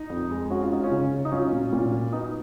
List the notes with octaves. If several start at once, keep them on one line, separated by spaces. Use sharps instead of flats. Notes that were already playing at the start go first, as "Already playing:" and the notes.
Already playing: D#4
F2
G#3
C#4 F#4
F4
C#4 D#4
C#4 F4
C#3
C#4
D#4
F#3 C#4 F4
A#2
A#2
F#3
B3 D#4